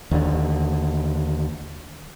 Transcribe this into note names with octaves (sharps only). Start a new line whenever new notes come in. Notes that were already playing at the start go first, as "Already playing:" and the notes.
D#2 D3